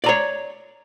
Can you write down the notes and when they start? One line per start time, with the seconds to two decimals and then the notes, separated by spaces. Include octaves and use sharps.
0.04 D5
0.06 A#5
0.09 C#5